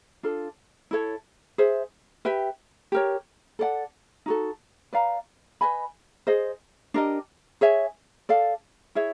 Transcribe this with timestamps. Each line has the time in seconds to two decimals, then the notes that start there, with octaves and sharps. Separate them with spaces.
0.23 D4 F4 A4
0.91 E4 A4 C#5
1.58 G#4 C5 E5
2.25 G4 B4 E5 G5
2.92 G4 A#4 C#5
3.59 A4 D5 F#5
4.26 D#4 F#4 A4
4.93 B4 D5 F5 A#5
5.61 B4 D#5 G#5 B5
6.27 G#4 C5 D#5
6.94 D4 G4 A#4 D#5
7.61 G#4 C#5 E5 G#5
8.29 A4 D5 F5
8.95 E4 G#4 C#5 E5